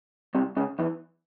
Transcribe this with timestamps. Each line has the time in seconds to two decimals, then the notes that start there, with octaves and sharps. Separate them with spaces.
0.35 C2 C3
0.57 C#2 C#3
0.79 E2 E3